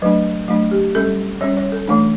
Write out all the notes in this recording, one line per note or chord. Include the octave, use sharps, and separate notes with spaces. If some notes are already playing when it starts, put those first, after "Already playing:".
F#3 A3 D4 B4
F#3 A3 D4
G4
G3 C#4 A4
G3 C#4 C#5
C#5
A4
E3 A3 D4